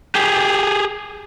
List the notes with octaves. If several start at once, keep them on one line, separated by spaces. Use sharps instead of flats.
G4 G#4